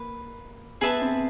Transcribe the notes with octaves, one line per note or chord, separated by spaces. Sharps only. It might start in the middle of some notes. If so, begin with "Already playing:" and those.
Already playing: A#3 B4
B3 G#4 B4 E5 A5
C4